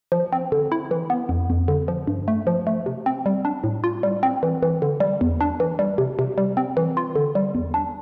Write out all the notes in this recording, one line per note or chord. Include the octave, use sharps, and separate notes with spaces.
F3
C4
D3
E4
E3
B3
F2
F2
D3
F3
G2
A3
F3
A3
C3
C4
G3
D4
A2
F4
G3
C4
E3
E3
D3
G3
E2
D4
E3
G3
C3
C3
G3
C4
E3
F4
D3
G3
E2
D4